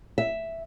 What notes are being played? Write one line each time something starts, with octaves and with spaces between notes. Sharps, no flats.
E5